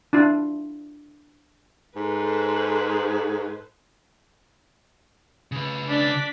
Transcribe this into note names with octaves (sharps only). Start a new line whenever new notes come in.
D4 E4 F4
G#2 A4 B4 C5
C#3 B4
D4 D5 B6